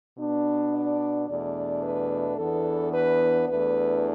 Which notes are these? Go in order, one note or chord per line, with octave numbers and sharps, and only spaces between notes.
B2 B3 D4
D5
E2 B2 A3 D4 D5
B4
E2 E3 B3 D4 A4
B4
E2 E3 A3 D4 B4